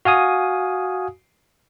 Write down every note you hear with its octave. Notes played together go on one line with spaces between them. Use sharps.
F#4 F5 G#5 D#6